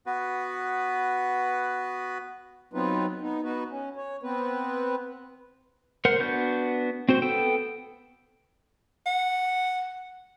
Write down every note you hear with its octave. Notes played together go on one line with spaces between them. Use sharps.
B3 F#4 B4
F#3 B3 C4 D#4 F4 B4
B3 D#4
B3 D#4 F#4 B4
C#4
C#5
B3 C4 B4
A#4 C5 F#5
B3 D4 F#4 G6
C4 F#4 C5
B3 A4 G5
F#5